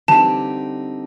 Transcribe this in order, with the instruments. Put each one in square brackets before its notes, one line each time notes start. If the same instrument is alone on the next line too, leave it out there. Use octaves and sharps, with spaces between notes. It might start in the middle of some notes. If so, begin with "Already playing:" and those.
[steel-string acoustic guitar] D3 G3 C4 D#4 G4 [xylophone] A5